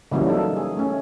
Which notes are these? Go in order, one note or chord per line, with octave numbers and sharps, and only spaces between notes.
C#3 E3 F#3 G3 A#3
D#4 A4
G#4
A3 C#4